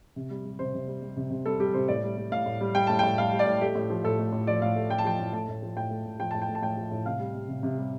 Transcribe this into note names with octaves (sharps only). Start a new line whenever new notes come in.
C3
G3
G3
C3 C5
C3
G3
G3
C3
C3
G3 A4
G3 G4
C3 C5
A2 D5
G3
G3
A2 F5
A2
G3
G3 G5
A2 A5
A2 G5
G3 F5
G3
D5
A2
A3 G4
A2
F3
A2 A4
A3
A2
F3 D5
A2 F5
A3
A2 G5
A5
F3 G5
A2
A3 A5
A2
F3
A2 G5
A3
A2
F3 G5
A2 A5
G5
A3
A5
A2 G5
F3
A2
C3 F5
G3
G3
C3
C3
G3